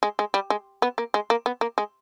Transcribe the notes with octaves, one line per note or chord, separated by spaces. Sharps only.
G#3
G#3
G3
G#3
B3
A#3
G#3
A#3
B3
A#3
G#3